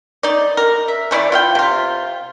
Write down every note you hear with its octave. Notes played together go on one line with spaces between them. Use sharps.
D#4 D5
A#4
E5
E3 A3 E4 D5
F4 F5 G5
C3 F4